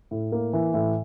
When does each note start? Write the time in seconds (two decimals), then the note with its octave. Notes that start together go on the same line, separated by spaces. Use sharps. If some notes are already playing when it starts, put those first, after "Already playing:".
0.11 A2
0.32 A#3
0.53 E3
0.74 A2